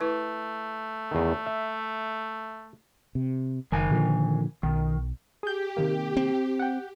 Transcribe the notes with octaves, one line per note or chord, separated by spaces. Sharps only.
A3 E4 B4
E2 D#3
E5
C3
F#1 D#3 G#5
A#2 D3 F3
B1 D#3
G4 G#4 G6
C3 D#3 A#3
C4
F#5 G5